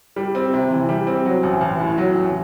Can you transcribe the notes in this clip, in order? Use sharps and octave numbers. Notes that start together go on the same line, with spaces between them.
G3
C4
C3
E3
G3
C4
F#3
A1
A1
A2
F#3
A1